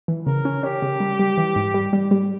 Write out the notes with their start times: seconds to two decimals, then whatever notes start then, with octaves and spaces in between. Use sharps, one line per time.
0.08 E3
0.26 C#3 A#4
0.45 C#4
0.63 C#4 G4
0.82 C#3
1.00 G3
1.19 G3
1.37 E3
1.56 G#2
1.74 G3
1.93 G3
2.11 G3